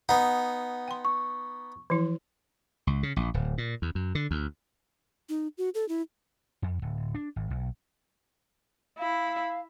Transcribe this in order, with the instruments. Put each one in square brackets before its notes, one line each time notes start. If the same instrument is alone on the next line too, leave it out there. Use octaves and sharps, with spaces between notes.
[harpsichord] B3 D#4 [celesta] F#5
[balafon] G5 C6
[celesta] C#6
[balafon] E3 F3 E4
[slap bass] C#2
C#3
A#1
D1
A#2
E2
F#2
D3
D2
[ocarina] D#4
F#4
A4
E4
[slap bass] F2
D1
D4
G#1
B1
[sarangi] E4 [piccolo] F5